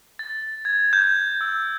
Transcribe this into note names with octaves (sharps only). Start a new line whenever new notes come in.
A6
G#6
G6
E6